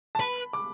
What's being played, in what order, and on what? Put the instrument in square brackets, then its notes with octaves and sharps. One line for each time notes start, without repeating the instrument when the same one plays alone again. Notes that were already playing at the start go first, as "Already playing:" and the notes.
[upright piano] A5
[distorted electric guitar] B4 [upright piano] B5
[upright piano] D6